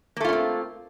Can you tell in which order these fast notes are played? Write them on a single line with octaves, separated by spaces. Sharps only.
A#3 A3 F4 C#4 C4